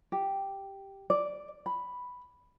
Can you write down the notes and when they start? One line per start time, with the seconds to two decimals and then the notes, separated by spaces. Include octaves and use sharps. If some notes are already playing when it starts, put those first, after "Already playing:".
0.12 G4
1.10 D5
1.66 B5